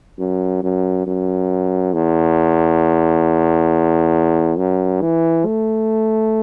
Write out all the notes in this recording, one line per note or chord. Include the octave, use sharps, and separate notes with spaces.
F#2
F#2
F#2
E2
F#2
E3
A3